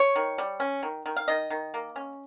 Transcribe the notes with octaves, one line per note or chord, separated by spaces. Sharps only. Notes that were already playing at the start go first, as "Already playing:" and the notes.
Already playing: C#5
D#3
G3
C#4
D#3
D#3
F5
D#3 D#5
D#3
A#3
C#4